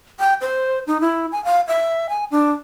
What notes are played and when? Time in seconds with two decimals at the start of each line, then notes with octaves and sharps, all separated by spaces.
0.20 G5
0.41 C5
0.87 D#4
1.01 E4
1.32 G#5
1.45 F5
1.68 E5
2.09 G#5
2.31 D4